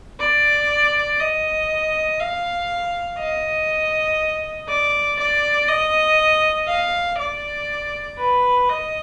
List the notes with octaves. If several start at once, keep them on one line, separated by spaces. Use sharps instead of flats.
D5
D#5
F5
D#5
D5
D5
D#5
F5
D5
B4
D#5